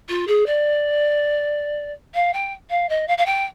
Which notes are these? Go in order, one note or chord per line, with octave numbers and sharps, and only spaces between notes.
F4
G#4
D5
F5
G5
F5
D#5
F5
F5
G5